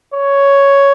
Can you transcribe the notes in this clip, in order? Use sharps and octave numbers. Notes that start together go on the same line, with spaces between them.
C#5